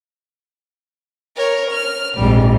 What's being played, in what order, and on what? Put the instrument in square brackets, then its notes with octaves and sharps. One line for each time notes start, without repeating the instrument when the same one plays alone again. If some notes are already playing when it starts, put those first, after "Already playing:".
[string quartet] A#4 C#5
F6
[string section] A#1 G#2 C3 [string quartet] F2 G3